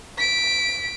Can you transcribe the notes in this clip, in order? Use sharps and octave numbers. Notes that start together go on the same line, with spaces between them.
B6 D7